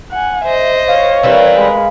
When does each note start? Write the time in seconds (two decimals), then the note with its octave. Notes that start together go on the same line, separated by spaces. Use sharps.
0.12 F#5 G#5
0.44 C5 D#5 E5
0.88 C#5 F5
1.23 E3 G3 C4 A#4 B4
1.56 G#3 B5